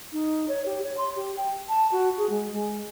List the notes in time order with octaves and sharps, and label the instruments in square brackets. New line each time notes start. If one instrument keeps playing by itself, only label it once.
[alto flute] D#4
C#5
G4
C#5
C6
G4
G5
A5
F#4
G#4
G#3
G#3